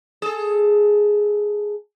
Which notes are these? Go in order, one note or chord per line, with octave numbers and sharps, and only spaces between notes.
G#4 A4